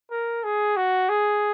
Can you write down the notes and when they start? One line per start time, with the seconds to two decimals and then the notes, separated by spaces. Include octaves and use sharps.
0.11 A#4
0.44 G#4
0.77 F#4
1.09 G#4